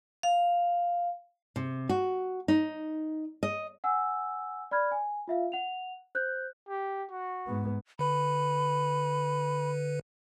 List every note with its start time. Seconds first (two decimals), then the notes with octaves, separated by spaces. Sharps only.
0.23 F5
1.56 C3
1.89 F#4
2.48 D#4
3.43 D#5
3.84 F#5 G#5 E6
4.71 D5 B5 F6 G#6
4.91 G#5
5.28 F4 E5 F5
5.52 F#5 F7
6.15 C5 F#6 G6
6.69 G4
7.11 F#4
7.47 G#2 B3
7.99 D3 B4 B5